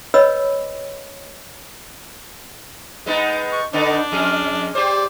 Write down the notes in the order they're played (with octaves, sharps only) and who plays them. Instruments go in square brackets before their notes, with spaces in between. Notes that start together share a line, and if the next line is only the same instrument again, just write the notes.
[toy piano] B4 C#5 D#5 B5 E6
[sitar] G#3 B3 D#4
[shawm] C#6
[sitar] D3 B3 D#4 [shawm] D4
[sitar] F2 G#4
[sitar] G4 C5 [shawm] D5